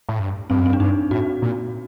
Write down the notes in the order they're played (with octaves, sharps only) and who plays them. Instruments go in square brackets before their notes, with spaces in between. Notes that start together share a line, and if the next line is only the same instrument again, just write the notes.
[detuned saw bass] A2
G2
[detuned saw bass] G2 [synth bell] C4
[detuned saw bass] F#2
[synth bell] C4
[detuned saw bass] G2
[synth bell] D4
[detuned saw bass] G2 [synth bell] D#4
[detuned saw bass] A2 [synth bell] F#4
[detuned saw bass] A#2